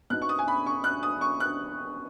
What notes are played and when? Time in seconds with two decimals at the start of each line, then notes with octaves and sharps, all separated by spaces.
0.10 B2 B3 D#4 F#6
0.22 C#6
0.29 D#6
0.39 G#5
0.48 B5
0.66 C#6
0.84 F#6
1.03 D#6
1.21 C#6
1.40 F#6